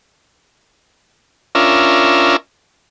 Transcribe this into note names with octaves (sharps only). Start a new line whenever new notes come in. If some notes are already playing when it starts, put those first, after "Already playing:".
C#4 D4 F4 A#4 E5